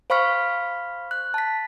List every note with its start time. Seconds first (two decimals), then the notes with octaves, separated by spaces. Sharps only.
0.10 C5 F5 B5 C#6 F6 B6
1.11 F#6
1.34 A5 B6